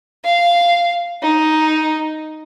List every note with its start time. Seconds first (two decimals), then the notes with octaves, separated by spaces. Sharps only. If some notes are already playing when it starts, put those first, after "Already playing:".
0.24 F5
1.22 D#4